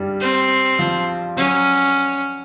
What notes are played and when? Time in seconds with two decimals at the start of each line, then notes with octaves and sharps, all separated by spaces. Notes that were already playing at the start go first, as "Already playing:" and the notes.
Already playing: G2 G3
0.21 C4
0.79 F3
1.37 F#3 C#4